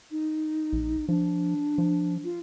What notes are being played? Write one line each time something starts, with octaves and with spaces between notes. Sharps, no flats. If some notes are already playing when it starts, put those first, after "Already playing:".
D#4
A#1
F3 D4
F3
F4